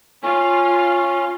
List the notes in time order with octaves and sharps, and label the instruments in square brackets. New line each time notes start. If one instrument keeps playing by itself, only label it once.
[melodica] C#4 [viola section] F4 F5